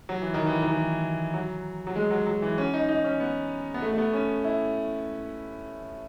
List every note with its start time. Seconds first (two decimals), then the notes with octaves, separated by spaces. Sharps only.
0.09 F#3
0.22 E3
0.34 D#3
0.46 E3
0.62 D#3
0.71 E3
1.34 F#3
1.87 F#3
1.96 G#3
2.11 F#3
2.26 F#3
2.42 E3
2.58 C#4
2.74 D#4
2.89 D#4
3.04 C#4
3.20 B3
3.74 B3
3.82 A3
3.93 A3
3.98 B3
4.13 C#4
4.44 E4